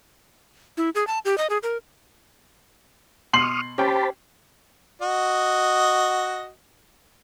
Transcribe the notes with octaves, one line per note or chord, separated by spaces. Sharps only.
E4
G#4
A5
G4
D#5
G#4
A#4
B2 C6 C#6 D#6 F6 C7 F#7
C#4 G4 C5 G5 A5 B5
F#4 D#5